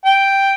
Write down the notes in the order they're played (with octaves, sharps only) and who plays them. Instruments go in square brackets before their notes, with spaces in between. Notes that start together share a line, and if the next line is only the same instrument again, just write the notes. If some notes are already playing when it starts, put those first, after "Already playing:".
[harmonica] G5